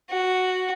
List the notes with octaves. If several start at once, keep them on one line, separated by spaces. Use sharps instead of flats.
F#4